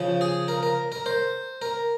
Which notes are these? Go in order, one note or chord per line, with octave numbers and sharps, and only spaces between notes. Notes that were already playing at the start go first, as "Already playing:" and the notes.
Already playing: C#3 F3
G#4
A#4
A#4
A#4
C5
A#4